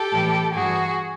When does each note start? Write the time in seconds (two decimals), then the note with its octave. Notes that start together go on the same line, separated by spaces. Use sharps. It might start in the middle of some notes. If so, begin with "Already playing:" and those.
Already playing: G4 A4
0.12 A2 E3 G3
0.54 G2 E3 G3 F#4 G#4